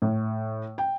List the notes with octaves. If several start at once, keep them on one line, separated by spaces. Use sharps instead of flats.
A2
G5